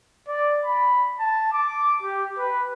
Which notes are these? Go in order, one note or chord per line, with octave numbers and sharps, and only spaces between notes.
D5
B5
A5
D6
G4
B4